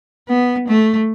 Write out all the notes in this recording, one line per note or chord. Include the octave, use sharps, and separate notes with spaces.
B3
A3